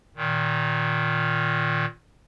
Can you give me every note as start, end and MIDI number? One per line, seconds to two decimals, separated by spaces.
0.17 1.86 46
0.17 1.86 51